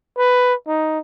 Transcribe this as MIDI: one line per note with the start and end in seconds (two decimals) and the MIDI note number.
0.18 0.55 71
0.68 0.99 63